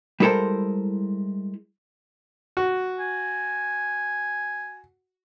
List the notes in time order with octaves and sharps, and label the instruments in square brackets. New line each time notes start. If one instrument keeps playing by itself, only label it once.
[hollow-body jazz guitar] G3 G#3 E4 A4 A#4 C5
[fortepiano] F#4
[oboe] G#5